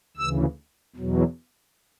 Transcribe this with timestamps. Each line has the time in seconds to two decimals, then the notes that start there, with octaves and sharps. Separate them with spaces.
0.17 D2 C#3 E3 E6
0.96 E2 B2 F#3